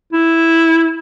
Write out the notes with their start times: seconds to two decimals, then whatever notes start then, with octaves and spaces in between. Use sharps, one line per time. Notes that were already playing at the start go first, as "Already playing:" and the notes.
0.13 E4